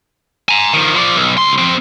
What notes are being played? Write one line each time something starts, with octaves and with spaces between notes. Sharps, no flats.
G#5 A#5
D#3 F3
F3 D5
B1
C#2 C6
F3 C4